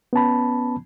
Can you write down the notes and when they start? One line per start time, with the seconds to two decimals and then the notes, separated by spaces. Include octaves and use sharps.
0.13 B3 C#4 A5 B5